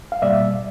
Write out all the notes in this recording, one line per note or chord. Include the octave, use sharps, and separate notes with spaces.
F5
B2 G3 A#3 D5 E5